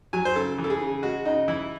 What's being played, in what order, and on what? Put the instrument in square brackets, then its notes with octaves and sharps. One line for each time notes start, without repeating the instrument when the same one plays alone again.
[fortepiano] F#3 G#5
C5
C#3 A4
E3
A4
G#4
C#3
G#3 F#4
C#3 D#4
E3 E4